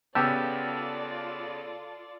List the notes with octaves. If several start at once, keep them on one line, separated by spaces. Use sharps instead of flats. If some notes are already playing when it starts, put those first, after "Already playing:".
C#3 B3 F4 G4 A4 D5 A5 E6